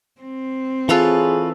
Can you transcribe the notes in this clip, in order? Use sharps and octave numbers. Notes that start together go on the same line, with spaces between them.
C4
E3 F4 G#4 A4 B4 C#5